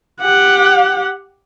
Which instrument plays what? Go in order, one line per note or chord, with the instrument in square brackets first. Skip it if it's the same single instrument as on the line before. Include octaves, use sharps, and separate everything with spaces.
[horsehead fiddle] G4 F#5